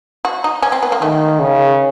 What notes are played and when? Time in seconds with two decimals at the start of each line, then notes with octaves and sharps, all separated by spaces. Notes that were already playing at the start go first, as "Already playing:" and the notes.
0.25 F#4
0.44 D#4
0.62 C#4
0.72 C4
0.83 B3
0.92 A#3
1.02 D#3 A3
1.40 C#3